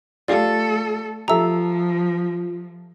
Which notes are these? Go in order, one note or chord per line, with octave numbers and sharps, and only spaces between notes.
A3 F4 G4 A4 D5 F5
F3 F4 G4 A4 E5 A#5 E6